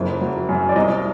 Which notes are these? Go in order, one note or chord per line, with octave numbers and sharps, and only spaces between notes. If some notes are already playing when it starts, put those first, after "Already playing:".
Already playing: F#1 F2
F#3
F#2
D5
C2 D#5